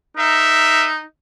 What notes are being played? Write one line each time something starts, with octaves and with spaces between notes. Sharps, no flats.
D#4 A#4 E5